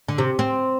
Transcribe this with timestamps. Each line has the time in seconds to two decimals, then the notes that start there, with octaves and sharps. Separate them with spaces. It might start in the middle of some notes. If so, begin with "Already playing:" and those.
0.08 D3
0.18 C3
0.39 C4